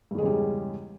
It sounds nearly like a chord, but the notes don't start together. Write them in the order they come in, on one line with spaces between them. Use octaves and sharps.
G2 E2 G#3 C#3 G3